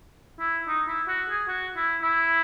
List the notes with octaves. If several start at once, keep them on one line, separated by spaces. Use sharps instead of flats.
E4
D#4
E4
F#4
G#4
F#4
E4
E4